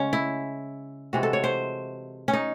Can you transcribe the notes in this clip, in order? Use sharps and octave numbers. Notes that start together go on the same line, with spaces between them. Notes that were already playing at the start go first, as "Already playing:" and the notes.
Already playing: C#3 G#3 C#4
E4
C3 E3 G#3 F#4
A4
C#5
C5
C#4
D#4